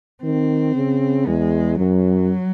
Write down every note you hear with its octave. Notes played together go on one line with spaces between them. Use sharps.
D#3 C4
C#3
E2 G#3
F#2 F#3